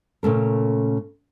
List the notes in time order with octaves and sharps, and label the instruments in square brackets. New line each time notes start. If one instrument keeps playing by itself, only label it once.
[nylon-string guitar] A#2 C#3 A3 A#4